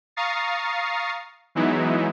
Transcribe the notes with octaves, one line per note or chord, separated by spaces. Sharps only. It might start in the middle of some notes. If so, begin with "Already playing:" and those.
F5 A#5 C#6 D#6 A6 C7
E3 F#3 G#3 B3 D#4 E4